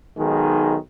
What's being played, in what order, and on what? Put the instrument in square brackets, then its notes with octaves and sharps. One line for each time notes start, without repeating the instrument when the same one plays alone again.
[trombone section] B1 D#3 G#3